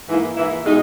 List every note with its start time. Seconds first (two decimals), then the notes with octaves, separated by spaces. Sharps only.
0.07 G#2 E3 A#3 E4
0.36 G#2 E3 A#3 E4
0.64 B2 G#3 D#4